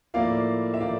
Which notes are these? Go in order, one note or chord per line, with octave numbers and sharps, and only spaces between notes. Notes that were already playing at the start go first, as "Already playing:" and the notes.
A2 F3 A#3 E4 D5 F5
E5
A2 F3 A#3 E4 D5 F5